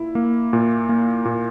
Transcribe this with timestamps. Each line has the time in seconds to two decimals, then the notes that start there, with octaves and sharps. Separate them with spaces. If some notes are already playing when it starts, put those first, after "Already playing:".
Already playing: A#2 E4
0.15 A#3
0.53 A#2
0.89 A#3
1.25 A#2